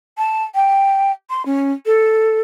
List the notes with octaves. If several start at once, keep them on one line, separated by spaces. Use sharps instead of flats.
A5
G5
C6
C#4
A4